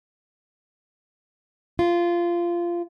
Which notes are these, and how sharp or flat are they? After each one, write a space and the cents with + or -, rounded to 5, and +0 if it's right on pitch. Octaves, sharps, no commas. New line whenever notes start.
F4 -15